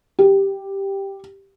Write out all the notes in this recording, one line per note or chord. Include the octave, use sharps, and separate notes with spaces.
G4